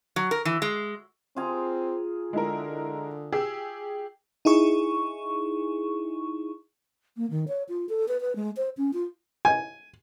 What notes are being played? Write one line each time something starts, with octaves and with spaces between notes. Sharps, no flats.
F#3
A#4
E3
G#3
C4 F4 G#4 A#5
D3 G#3 E4 A#4
G4 G#4 E6
D#4 E4 G#4 C#6
A#3
D#3
C#5
F4
A4
B4
B4
G#3
C5
C#4
F4
G#5